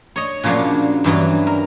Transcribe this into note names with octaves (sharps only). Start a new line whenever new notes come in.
C#5 D#5
A#2 C#3 F3 F#3 A#3 D4
G2 E3 F#3 D#5
A#4